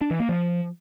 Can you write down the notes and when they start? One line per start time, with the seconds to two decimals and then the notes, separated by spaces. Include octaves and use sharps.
0.01 D4
0.11 E3
0.20 A#3
0.29 F3